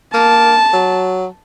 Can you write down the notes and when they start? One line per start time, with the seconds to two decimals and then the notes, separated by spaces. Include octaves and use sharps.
0.14 A#3 A5
0.73 F#3